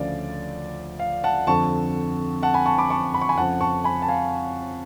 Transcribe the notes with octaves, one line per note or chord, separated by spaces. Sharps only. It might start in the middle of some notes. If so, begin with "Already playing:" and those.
Already playing: D2 C#3 F3 D5 F5
F5
F#5 A5
F2 D3 F3 A5 C#6
F#5 A5
G#5 B5
A5 C#6
B5 D6
A5 C#6
B5
C#6
G#5 B5
F2 C#3 F3 F#5 A5
A5 C#6
G#5 B5
A5
F5 G#5